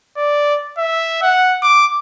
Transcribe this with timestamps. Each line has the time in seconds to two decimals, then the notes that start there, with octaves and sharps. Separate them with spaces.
0.17 D5
0.78 E5
1.22 F#5
1.62 D6